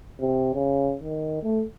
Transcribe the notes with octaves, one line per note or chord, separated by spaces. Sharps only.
C3
C#3
D#3
A3